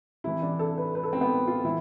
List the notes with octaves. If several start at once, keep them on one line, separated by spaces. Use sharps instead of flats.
C3 E3 E4
D4
A4
B4
B4
A4
C4
B3
F4
E3 E4